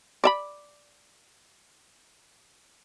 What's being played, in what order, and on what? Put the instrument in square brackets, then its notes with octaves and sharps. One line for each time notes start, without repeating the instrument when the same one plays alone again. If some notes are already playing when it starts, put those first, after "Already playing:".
[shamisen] D5 E5 B5